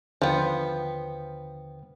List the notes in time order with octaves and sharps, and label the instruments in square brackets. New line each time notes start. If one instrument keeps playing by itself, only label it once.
[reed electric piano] D#2 D3 G5 [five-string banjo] F3 B3